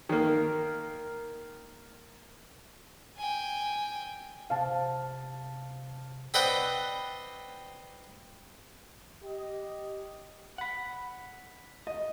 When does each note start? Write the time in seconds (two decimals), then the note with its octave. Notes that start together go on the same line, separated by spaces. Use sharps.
0.09 D#3 A#3
3.17 G5 G#5
4.50 C3 F5 A5
6.34 C4 B4 D5 D#5 F#5 G5
9.24 G4 D#5
10.58 F#5 B5
11.87 D#5